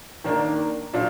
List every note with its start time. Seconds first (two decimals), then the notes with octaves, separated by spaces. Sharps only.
0.24 D#3 A#3 D4
0.93 A#2 F#3 D4